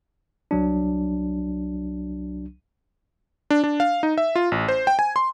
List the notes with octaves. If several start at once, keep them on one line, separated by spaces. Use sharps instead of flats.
C2 F#3 D4
D4
D4
F5
D#4
E5
F4
A1
C5
G5
G#5
C6